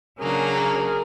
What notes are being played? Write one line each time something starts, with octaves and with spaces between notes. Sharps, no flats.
C#3 F#3 A#3 D4 G#4 A#4